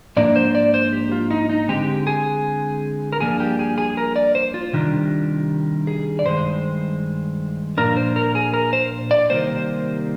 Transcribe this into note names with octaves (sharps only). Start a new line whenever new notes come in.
G#2 F3 A#3 D4 D5
C5
D5
C5
G4
F4
D#4
D#4
D3 G#3 C4 G4
G#4
A#4
G2 F3 A#3 D4 G#4
G4
G#4
G#4
A#4
D5
C5
F4
C3 D#3 G3 D4
G#4
D5
G2 D#3 G#3 C5
A#2 F3 A#3 D4 A#4
C5
A#4
G#4
A#4
C5
D5
C3 D#3 G3 A#3 C5